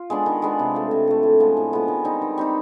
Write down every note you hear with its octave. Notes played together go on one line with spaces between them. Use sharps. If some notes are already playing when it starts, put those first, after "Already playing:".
Already playing: F4
G#3 B3 D4
D#3
G#3 B3 D4
C3
F3 A3
C3
F3 A3
A2
F3 G#3 B3
A2
F3 G#3 B3
D#3
G3 C4 D#4
D#3
G3 C4 D#4